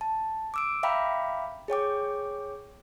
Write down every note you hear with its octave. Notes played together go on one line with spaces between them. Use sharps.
A5
D6 E6 D7
E5 F5 G5 A#5 B5 D6
G#4 C#5 G5 D6